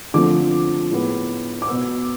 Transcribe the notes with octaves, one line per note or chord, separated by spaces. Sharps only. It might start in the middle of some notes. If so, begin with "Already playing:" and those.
D3 F3 A3 C4 D6
A2 G#3 B3
D6
B2 B3 E6